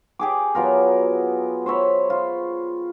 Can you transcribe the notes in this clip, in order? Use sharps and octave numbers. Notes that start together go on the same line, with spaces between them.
G4 G#4 D6
F#3 B3 F4 A#4
C5 C#5 E5 B5
F4